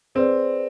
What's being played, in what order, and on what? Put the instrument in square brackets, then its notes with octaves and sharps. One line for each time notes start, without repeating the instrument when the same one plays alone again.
[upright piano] C4 [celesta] G#4 B4 D5